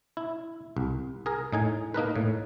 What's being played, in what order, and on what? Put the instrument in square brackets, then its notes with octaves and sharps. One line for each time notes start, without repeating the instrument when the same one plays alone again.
[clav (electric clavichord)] E4
C2
G#4 A#4
A2 D#4 G#5
A#3 D#4 A#4 B4
A2